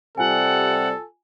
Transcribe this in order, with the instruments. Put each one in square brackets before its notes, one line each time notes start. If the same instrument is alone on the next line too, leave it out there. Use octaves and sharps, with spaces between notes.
[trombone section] C3 G3 [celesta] F4 G#5 [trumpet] A4 [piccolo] F#5